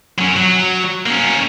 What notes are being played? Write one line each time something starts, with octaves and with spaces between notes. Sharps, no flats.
F#3 C#4
F#3
A#3 C#4